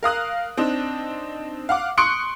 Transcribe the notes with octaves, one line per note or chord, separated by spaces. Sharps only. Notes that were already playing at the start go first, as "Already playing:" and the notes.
A#4 F5 D#6 F#6
C4 D4 D#4
F5 F#5 D6
C6 C#6 D#6 F#6 C#7 D7